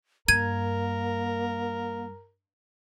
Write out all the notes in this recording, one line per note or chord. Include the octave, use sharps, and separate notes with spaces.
G2 A#3 A#4 G#6 D#7